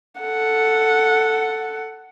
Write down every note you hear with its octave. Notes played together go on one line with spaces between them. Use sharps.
A4 F#5